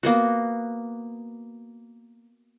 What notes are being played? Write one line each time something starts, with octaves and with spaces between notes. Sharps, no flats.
A#3 B3 F#4